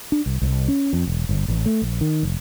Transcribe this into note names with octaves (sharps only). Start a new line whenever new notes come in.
D4
C2
C2
C#4
F2
E1
G1
A1
A3
A#1
D#3
F1